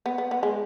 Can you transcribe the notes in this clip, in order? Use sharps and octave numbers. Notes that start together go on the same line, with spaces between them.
B3
B3
B3
G#3